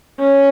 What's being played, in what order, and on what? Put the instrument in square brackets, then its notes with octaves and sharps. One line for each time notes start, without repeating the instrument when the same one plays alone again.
[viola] C#4